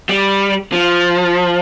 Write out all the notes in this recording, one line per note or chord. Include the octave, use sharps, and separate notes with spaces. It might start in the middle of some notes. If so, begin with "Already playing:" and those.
G3
F3